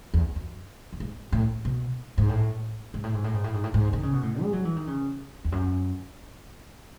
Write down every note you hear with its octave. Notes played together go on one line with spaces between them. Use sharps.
E2
F#2
F#2
G#2
A2
B2
G#2
A2
G#2
A2
G#2
A2
G#2
A2
G#2
A2
G#2
D#3
C#3
B2
A2
G#3
F#3
E3
D#3
C#3
E2
F#2